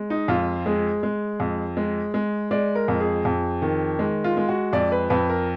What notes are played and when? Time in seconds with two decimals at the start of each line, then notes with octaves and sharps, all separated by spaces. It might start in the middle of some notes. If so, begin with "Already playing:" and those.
Already playing: G#3
0.10 D#4
0.28 F2 F4
0.66 G#3 G#4
1.03 G#3
1.40 F2
1.77 G#3
2.14 G#3
2.51 G#3 D5
2.75 A#4
2.88 F2
3.00 G#4
3.25 F2
3.62 D#3
3.99 G#3
4.24 F4
4.37 G#3
4.49 F#4
4.73 F2 D5
4.92 B4
5.10 F2 B4
5.29 A#4